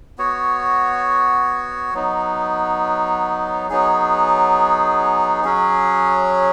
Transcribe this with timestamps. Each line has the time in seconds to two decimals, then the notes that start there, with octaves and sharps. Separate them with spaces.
0.18 B3 F#4 C#5
1.94 F#3 B3 D#4
3.69 F#3 B3 D#4 G#4
5.44 F#3 C#4 G#4